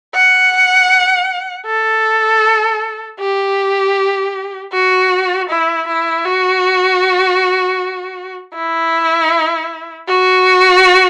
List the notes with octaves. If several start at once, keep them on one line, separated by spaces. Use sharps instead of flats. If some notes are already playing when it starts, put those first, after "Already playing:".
F#5
A4
G4
F#4
E4
E4
F#4
E4
F#4